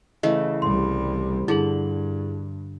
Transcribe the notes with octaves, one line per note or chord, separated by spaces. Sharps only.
C#3 E3 A3 D#5
C2 G3 C6
G2 D3 E4 G#4 F#7